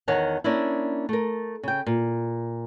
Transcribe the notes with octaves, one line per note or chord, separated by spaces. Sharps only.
E2 D#3 C#5 F#5 A5
A#3 C#4 D4 E4
A3 A#4
C#3 G5
A#2